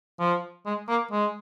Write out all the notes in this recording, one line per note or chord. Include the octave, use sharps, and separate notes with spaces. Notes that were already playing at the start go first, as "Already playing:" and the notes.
F3
G#3
A#3
G#3